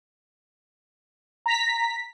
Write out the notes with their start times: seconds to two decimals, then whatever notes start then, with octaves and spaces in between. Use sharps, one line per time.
1.46 A#5 B6